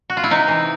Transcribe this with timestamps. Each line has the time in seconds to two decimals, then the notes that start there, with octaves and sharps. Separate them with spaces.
0.10 F#4
0.17 F4
0.24 E4
0.31 C3 D#4
0.48 E3